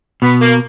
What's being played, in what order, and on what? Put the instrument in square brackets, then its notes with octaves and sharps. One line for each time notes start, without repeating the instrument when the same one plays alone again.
[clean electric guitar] B2 [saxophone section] B3
[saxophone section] A#3